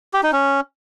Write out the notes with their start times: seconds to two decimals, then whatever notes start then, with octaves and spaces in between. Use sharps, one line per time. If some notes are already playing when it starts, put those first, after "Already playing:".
0.14 G4
0.23 D#4
0.32 C#4